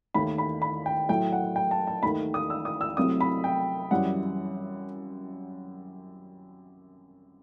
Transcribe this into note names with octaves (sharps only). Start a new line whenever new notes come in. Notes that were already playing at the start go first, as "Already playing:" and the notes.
D#2 D#3 A3 B5
B5
B5
G5
A2 F#3 A3 G5
F#5
G5
A5
A5
D#2 D#3 A3 B5
D#6
E6
D#6
E6
C2 C3 F#3 A3 D#6
B5
G5
F#2 E3 G3 F#5